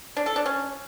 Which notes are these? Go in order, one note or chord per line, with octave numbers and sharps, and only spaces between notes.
D4
A4
D4
C#4